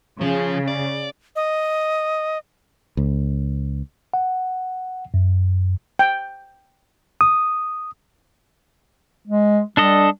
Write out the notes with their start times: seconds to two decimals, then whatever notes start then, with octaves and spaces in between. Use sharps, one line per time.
0.21 C#3 F3
0.68 D5
1.36 D#5
2.97 C#2
4.14 F#5
5.14 F#2
5.99 G5
7.21 D#6
9.28 G#3
9.77 G3 D4 A4 D#5